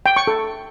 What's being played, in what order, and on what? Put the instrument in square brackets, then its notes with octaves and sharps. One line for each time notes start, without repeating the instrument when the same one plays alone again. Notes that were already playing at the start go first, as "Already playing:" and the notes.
[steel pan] G5
C#6
A4